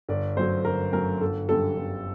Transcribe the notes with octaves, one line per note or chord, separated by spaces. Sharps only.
G1 D5
F#2 F#3 A3 C5
G1 A#4
F#2 F#3 A3 A#4
G1 A4
F#2 D3 G3 A4
G1